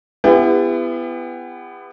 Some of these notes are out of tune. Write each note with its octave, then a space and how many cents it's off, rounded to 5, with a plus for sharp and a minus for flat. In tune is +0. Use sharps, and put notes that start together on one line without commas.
B3 +20 E4 +35 G4 +45